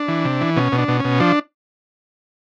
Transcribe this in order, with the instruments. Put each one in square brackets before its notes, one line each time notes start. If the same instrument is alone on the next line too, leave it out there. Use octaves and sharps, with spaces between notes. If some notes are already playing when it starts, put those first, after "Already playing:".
Already playing: [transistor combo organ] D4
E3
C3
E3
B2 C#4
B2
D4
B2
B2 C#4
F3 D4